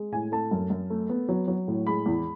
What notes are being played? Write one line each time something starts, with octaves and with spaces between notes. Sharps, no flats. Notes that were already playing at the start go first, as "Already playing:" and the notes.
Already playing: G#3
A2 G#5
A3 A5
F#2
F#2
A3
B3
F#3
F#3
A2
G#3 B5
E2